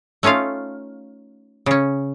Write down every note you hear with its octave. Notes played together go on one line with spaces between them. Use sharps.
A3 C#4 D#4 F4 F5
C#3 C#4